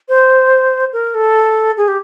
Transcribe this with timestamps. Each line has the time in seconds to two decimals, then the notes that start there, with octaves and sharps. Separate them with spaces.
0.09 C5
0.93 A#4
1.15 A4
1.77 G#4
1.88 G4